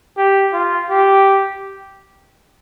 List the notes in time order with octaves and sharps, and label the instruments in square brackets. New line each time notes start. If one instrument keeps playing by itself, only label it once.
[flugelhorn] G4
F4
G4